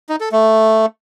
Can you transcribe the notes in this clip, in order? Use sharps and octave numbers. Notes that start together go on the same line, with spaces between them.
D#4
A4
A3